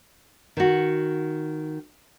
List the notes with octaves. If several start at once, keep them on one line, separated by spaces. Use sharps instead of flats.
D#3 F#4